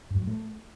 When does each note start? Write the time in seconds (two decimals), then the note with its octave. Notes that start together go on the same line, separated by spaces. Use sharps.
0.11 G2
0.16 F#3
0.22 A2
0.27 A3